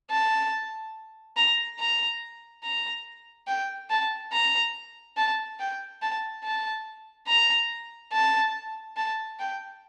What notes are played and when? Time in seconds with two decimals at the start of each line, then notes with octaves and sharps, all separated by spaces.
0.10 A5
1.37 A#5
1.79 A#5
2.63 A#5
3.47 G5
3.90 A5
4.32 A#5
5.17 A5
5.59 G5
6.01 A5
6.44 A5
7.28 A#5
8.13 A5
8.97 A5
9.39 G5